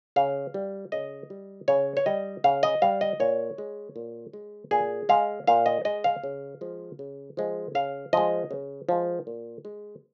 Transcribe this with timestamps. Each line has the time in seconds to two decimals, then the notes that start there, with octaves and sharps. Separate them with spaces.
0.16 C#3 F5
0.54 G3
0.92 C#3 D#5
1.30 G3
1.68 C#3 C#5
1.97 C#5
2.06 G3 D#5
2.44 C#3 F5
2.63 D#5
2.82 G3 F5
3.01 D#5
3.20 A#2 C#5
3.58 G#3
3.96 A#2
4.33 G#3
4.71 A#2 G#4
5.09 G#3 F5
5.47 A#2 F5
5.66 D#5
5.85 G#3 D#5
6.04 F5
6.24 C#3
6.61 F3 G#3
6.99 C#3
7.37 F3 G#3
7.75 C#3 F5
8.13 F3 G#3 D#5
8.51 C#3
8.89 F3 G#3
9.27 A#2
9.65 G#3